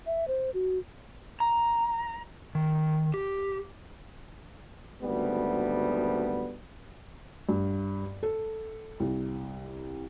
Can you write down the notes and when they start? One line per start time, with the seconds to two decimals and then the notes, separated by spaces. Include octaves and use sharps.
0.06 E5
0.28 C5
0.54 F#4
1.40 A#5
2.55 D#3
3.14 G4
5.02 G#1 D2 G3 B3
7.49 G2
8.23 A4
9.00 C2